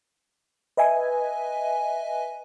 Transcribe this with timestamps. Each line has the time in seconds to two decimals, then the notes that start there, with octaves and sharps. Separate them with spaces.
0.77 B4 D#5 E5 G#5